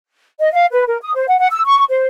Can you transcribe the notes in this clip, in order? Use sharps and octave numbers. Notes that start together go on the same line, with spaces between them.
D#5
F5
B4
A#4
D#6
C5
F#5
F#5
E6
C#6
C5